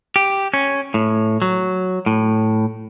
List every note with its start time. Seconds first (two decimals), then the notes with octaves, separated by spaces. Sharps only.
0.16 G4
0.54 C#4
0.94 A2
1.42 F#3
2.06 A2